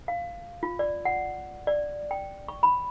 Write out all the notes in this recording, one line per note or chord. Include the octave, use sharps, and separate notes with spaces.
F5
F4
D5
F#5
D5
G5
C#6
B5